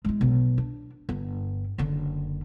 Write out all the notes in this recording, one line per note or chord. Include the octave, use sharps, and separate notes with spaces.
G#3 E4
B1
D4
G1
F#1 D3